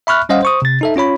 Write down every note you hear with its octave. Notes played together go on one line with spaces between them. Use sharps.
E5 B5 C#6 F6 F#6
G3 C#4 C5 D#5 F5 F#5
C5 C#6 D#6
C3 A6
D#4 A4 E5
C#4 F4 C#5 B5